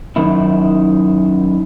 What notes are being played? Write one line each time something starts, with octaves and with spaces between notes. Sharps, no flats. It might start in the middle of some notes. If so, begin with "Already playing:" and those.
F#2 D#3 E4